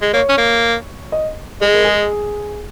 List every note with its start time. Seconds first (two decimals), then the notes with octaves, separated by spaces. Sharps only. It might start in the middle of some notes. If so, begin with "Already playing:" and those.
0.02 G#3
0.13 A#3 C#5
0.29 C#4
0.38 A#3
1.12 D#5
1.61 G#3 G#4
1.73 A#4
1.84 G#4